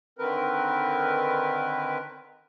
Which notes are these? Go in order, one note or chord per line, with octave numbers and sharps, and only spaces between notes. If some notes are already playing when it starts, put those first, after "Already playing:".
D3 D#3 C4 A#4 B4